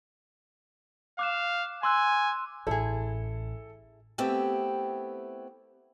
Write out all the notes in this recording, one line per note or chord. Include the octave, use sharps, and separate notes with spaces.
F5 D6 F#6 E7
G#5 C6 E6 F#6
A1 E4 G#4 A4
A3 B3 C4 E4 G4